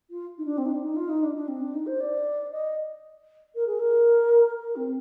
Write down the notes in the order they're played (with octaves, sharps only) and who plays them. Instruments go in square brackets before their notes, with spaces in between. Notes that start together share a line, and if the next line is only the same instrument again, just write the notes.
[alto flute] F4
D#4
D4
C4
D#4
D4
D#4
F4
D#4
D4
D4
C4
D4
D#4
C5
D5
D#5
A#4
G#4
A#4
A#4
C4